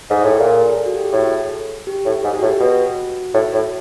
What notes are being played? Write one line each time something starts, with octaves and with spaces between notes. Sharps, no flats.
G#2 G#4
A2 G#4
A#2 A4
A4
F#4
G4
G#4
A2 A4
G4
A2
G#2 G#4
G4
A2 F#4
G4
B2 F#4
A2
A2